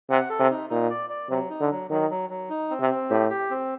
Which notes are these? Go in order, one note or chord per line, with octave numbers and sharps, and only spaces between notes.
C3 F#5
A4
C3
D#4
A#2 D#4
D5
D5
C3 F#3
D#4
D3
F#3
D#3 F#3
F#3
F#3
D#4
C4
C3
C4
A2 G4
G4
C4